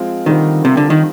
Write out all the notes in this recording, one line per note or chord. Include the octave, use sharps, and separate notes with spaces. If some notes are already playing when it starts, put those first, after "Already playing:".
Already playing: F3 G#3 C4 F4
D3 D#3 G3 C4 F4 A#4
C3
D3
D#3